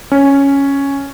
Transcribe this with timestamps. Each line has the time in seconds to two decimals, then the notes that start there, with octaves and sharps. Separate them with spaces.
0.12 C#4